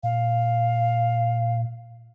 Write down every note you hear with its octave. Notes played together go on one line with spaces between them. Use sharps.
A#2 F5